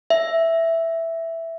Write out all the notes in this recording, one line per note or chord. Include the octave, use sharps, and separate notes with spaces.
E5